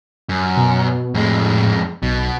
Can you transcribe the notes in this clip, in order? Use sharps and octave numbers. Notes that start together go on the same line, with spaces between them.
F#2
B2
F2 A2 G#3
B1 B2